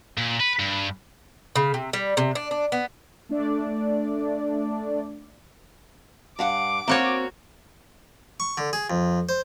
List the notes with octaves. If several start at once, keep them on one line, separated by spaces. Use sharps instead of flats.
A#2
B4
G2
C#3
C3
G3
C3
D4
D4
B3
A3 D4 D5
G2 F5 F#5 D6
A#3 C4 F#4 C#5
C#6
D3
G#4
F2
C5